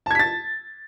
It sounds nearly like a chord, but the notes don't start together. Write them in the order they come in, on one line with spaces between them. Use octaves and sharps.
A5 G#6 B6 A6